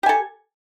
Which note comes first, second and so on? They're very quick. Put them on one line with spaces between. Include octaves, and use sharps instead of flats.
G4 G#5 A4